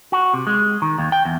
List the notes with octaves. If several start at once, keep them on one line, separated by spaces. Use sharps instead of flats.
F#4
C3
G#3
D#3
D#2
G5
E2